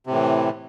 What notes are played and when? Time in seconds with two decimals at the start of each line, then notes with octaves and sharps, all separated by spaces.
0.07 C3
0.10 A2
0.14 E3